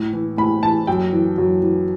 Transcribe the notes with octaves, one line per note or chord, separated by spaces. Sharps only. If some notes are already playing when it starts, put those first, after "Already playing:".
Already playing: A2
E3
A2 B5
E3 A5
F#2 G5
E3
F#2
E3